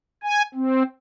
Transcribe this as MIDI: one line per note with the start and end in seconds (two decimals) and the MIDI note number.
0.23 0.42 80
0.54 0.83 60